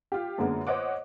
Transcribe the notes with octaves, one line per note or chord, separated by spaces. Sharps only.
F4 G4
F#2 D3 G#3 A#3 B3
C5 C#5 D#5 F#5 D6